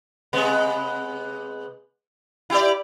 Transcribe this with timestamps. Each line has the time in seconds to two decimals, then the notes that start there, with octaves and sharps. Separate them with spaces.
0.33 C3 G#3 B3
2.50 E4 G4 D5